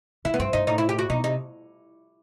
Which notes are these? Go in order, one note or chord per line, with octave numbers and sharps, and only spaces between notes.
D#3 E4
B3
G2 C4
G2 D#4
A2 D#4
E4
G4
F#4
B2 D#4
C3 D#4